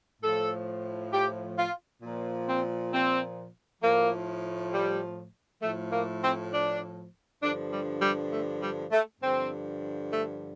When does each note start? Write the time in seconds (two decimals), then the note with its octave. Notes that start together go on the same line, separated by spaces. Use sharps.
0.22 A2 F3 A4
1.12 G4
1.57 F4
2.02 A#2 F3
2.47 C4
2.92 C4
3.82 A2 F3 A#3
4.72 G3
5.62 A2 F3 A3
5.91 A#3
6.22 C4
6.52 D4
7.41 G2 D3 F3 D4
7.72 G3
8.01 G3
8.31 A3
8.61 G3
8.91 A3
9.21 G2 D3 F3 C4
10.11 A3